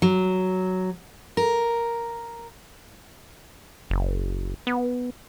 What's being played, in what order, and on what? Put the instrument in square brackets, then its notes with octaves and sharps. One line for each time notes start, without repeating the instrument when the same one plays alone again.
[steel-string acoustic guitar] F#3
A#4
[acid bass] F#1
B3